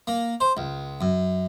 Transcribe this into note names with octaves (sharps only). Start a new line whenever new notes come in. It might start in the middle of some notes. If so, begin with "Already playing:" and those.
A#3
C5
C#2
F#2